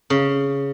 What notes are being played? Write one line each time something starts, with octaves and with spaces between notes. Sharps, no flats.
C#3